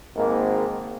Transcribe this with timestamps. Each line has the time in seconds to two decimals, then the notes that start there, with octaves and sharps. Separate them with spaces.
0.16 G#1 G#2 D#3 A#3